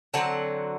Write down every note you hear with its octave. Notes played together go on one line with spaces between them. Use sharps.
D3 F#3 C4 F#5 A5